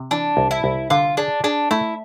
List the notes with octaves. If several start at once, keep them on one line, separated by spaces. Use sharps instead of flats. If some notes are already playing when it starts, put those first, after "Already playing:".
Already playing: C3
E3 D4
C2
E4
C2
D3 F4
D4 G#4
D4 G#4
A3 E4